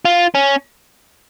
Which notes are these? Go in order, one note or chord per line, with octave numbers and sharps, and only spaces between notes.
F4
C#4